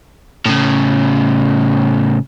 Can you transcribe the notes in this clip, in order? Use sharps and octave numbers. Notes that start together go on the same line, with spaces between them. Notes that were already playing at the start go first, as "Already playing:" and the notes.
A2 C#3